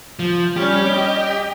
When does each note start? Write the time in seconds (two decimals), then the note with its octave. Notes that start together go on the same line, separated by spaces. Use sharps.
0.19 F3
0.57 G3 C#4 G4
0.88 D#5